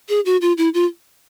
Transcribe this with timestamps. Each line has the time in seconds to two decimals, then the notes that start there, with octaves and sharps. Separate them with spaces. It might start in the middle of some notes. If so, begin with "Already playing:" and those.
0.09 G#4
0.26 F#4
0.41 F4
0.58 E4
0.74 F4